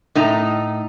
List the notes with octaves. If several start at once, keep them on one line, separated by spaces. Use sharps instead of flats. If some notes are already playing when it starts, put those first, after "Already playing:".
A2 D#4 A#5